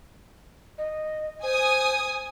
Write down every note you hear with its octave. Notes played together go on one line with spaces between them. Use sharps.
D#5
C5 G#5 D#6